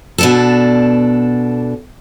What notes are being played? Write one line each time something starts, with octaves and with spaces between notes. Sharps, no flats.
B2 D4 A4